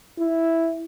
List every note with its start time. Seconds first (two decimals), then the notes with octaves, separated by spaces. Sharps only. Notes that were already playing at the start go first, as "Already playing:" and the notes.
0.19 E4